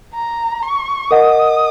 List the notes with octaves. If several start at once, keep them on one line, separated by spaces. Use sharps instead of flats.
A#5
C#6
A#4 D#5 F#5 D#6